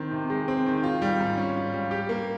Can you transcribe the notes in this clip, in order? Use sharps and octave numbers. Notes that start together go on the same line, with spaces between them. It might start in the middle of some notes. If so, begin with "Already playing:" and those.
Already playing: D#3 C4
C3
G#3
C4
D#3
F4
G3
G#2
C#4
F4
G3
G4
A#3